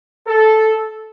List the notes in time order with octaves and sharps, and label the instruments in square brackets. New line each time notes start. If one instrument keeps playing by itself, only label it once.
[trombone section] A4